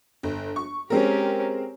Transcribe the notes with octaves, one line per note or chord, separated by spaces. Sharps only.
G1
C#6
G#3 C4 C#4 G4 A#4